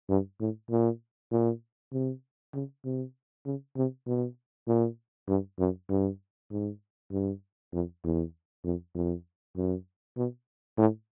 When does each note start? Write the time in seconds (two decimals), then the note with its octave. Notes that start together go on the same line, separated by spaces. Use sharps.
0.09 G2
0.40 A2
0.71 A#2
1.32 A#2
1.93 C3
2.54 C#3
2.85 C3
3.45 C#3
3.76 C3
4.07 B2
4.68 A#2
5.28 G2
5.59 F#2
5.90 G2
6.51 G#2
7.12 G2
7.73 F2
8.04 E2
8.65 F2
8.95 F2
9.56 F#2
10.17 B2
10.78 A2